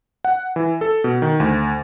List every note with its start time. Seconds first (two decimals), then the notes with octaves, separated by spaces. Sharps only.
0.25 F#5
0.56 E3
0.81 A4
1.04 B2
1.22 D#3
1.40 D2